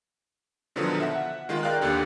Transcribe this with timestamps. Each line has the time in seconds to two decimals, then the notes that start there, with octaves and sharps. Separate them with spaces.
0.76 B2 D3 D#3 F3 F#3 B3
1.00 E5 F#5
1.49 D#3 G#3 F4
1.63 A#4 D5 F5 G5 F#6
1.82 D#2 D3 G4